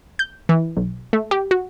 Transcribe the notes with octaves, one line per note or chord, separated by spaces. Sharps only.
G6
E3
B1
A3
G4
F#4